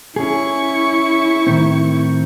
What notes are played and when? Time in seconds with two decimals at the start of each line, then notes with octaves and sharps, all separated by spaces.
0.16 C#4 E4 G#4 C#6
1.47 A2 D#3 C4